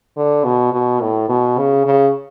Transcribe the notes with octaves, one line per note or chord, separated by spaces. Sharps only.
D3
B2
B2
A2
B2
C#3
C#3